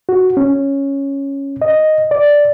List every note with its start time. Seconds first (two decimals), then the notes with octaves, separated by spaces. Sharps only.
0.09 F#4
0.37 C#4
1.62 D#5
2.11 D5